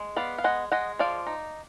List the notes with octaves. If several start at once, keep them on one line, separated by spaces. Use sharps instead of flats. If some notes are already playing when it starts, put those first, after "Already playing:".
Already playing: G#3
B3 D5 F5
F5
G#3 D#5 F#5
G#3 D#5 F#5
F3 D5 F5
D#4